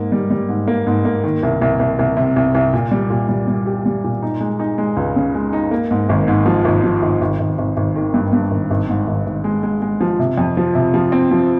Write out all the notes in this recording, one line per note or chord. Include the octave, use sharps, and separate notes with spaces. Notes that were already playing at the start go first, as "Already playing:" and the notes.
Already playing: G#2 A#3
G3
G3
G#2
A#3
G#2
A#3
D#3
C2
C2
C2
C2
C3
C2
C2
A#2
G3
A#2
G3
G3
G4
G3
A#2
D#4
G#3
D#4
G#3
C#2
C#3
G#3
D#4
A#3
G#2
G#1
G#2
F3
G#1
F3
G#1
G#1
G#1
G#1
G#1
D#3
G2
G2
G#1
G#1
G#2
G#1
G#1
G#3
G#3
G#3
F3
C3
F2
F3
C3
F3
C4
F3